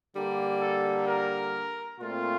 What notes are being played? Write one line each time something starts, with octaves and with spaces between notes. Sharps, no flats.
D3 G3 A#3
A4
A#4
A#2 A3 C4 F4